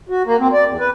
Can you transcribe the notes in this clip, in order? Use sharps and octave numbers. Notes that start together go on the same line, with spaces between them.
F#4
A#3
C4
D5
E2
B4